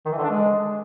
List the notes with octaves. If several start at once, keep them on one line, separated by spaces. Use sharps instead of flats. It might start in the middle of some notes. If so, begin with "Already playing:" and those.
D#3
E3
D3
D4
G#3